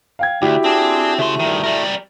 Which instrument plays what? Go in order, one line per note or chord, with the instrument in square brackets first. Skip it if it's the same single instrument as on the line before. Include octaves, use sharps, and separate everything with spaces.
[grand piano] F5 G5 G#6
[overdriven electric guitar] D2 [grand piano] E4 F#4 G4
[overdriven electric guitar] C4 [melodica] D4 G#4
[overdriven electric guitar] C#3 C6 [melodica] A3
[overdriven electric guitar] G2 D#3
G3 A#4